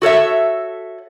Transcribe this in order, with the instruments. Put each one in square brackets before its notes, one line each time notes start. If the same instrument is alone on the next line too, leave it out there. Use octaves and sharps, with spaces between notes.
[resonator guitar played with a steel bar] F#4 A4 C#5 E5